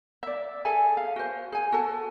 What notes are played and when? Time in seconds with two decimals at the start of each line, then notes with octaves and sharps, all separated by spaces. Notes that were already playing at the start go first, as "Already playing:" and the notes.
0.23 D5 E5
0.65 G#4 A4 E5 G#5
0.97 F5
1.16 F#4 C5
1.52 G#4 G#5
1.72 F#4 A4 A5